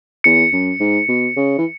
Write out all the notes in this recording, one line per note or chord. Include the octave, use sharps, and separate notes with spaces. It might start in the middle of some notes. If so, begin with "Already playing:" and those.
E2 C#7
F#2
G#2
B2
C#3
E3